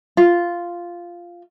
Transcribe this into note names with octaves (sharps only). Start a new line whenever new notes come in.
F4